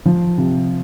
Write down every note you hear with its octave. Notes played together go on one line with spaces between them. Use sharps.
F3
C3